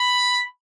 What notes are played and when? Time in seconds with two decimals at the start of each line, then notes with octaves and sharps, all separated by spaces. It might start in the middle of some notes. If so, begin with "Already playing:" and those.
Already playing: B5